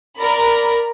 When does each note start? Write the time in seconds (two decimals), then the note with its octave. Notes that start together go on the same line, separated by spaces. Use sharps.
0.17 A#4 D5 A#5 B5